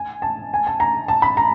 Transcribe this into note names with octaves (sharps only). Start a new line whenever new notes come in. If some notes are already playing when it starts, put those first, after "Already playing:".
Already playing: G#5
A5
G#5
A5
A#5
A5
B5
A#5